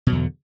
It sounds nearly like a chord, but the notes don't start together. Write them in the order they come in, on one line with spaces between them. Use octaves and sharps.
B2 F#3 E2 D3